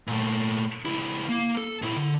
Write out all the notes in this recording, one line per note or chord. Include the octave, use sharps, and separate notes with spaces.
A#2 A3
C#2 E4
A#3
A4
A#2 E4
D3